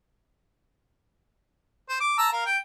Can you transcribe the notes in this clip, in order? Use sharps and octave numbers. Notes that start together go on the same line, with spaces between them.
C5
D6
A5 A#5 E6
A#4 F5
G5